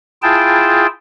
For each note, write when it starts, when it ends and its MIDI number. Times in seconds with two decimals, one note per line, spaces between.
0.22 0.86 64
0.22 0.86 65
0.22 0.86 68
0.22 0.86 79
0.22 0.86 81